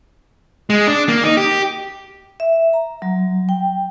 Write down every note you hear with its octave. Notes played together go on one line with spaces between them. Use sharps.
G#3
D4
A#3
D#4
G4
E5
A#5
F#3
G5